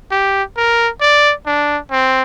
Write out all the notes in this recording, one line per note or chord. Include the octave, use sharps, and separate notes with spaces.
G4
A#4
D5
D4
C4